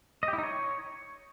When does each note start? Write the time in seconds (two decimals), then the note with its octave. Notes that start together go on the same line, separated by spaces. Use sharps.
0.23 D#5
0.28 G4
0.33 E4
0.38 D#4
0.43 C#5